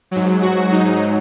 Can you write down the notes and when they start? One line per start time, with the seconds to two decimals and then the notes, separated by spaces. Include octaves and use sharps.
0.11 G#2 F#3
0.42 F#4
0.72 D#4